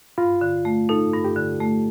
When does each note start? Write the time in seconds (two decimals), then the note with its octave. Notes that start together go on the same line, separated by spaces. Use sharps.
0.18 G2 F4
0.41 D3
0.65 A3
0.89 D#4 A4
1.13 G2
1.24 G4
1.36 D3
1.60 A3